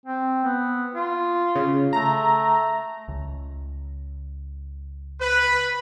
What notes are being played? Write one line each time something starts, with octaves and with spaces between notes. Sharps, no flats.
C4
B3
F4
C#3
A3 A#5
C#2
B4